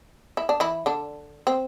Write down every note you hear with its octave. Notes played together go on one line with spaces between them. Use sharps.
E4
D4
E3 E4
D3 D4
C4